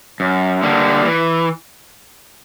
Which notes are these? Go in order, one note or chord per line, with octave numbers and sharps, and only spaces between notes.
F#2
D3 G3 A#3
E3